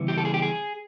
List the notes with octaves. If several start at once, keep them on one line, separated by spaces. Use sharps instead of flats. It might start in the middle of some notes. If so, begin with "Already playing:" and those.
Already playing: C#3 E3 G3 B3
G4
A4
G#4
G4
G#4